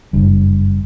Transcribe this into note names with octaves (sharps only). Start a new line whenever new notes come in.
F#1 G2